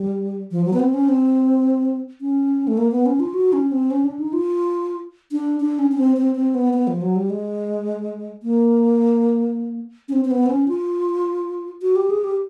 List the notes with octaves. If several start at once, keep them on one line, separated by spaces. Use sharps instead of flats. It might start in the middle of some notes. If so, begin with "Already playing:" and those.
Already playing: G3
F3
F#3
B3
C4
C#4
C4
C#4
A3
A#3
B3
C#4
F4
F#4
C#4
C4
C#4
D4
D#4
F4
D4
D4
C#4
C#4
C4
C4
C4
B3
B3
F3
F#3
G3
G#3
A#3
C#4
C4
C4
B3
C4
C#4
F4
F#4
G4
G#4
G4